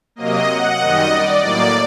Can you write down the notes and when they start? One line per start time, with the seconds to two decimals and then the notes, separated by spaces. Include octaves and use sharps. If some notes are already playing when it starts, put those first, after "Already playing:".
0.16 C3 F#3 A#3 D#5
0.47 F#5
0.78 F#2 D#3 G3 D#5
1.10 D5
1.40 A2 F#3 A#3 D5